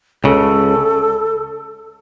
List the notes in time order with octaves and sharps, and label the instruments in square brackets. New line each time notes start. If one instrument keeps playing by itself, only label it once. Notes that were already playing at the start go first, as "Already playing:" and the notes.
[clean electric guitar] C#2 C#3 [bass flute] A4